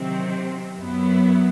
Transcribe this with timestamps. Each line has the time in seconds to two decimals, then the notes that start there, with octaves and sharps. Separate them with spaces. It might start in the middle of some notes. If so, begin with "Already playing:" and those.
Already playing: C3 D#3 F#3 C4
0.78 F#2 F#3 B3 E4